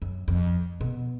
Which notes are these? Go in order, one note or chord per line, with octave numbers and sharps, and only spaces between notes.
F#2
F2
B2